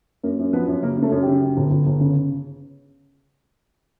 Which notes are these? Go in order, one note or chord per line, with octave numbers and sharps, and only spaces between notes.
F#2 A#3 A#4
F#2
F3 B3 B4
F#2
C#3 A#3 A#4
C#3
A3 A4
F#2
C#3 G4
F#2
G1
G1
G1
C#3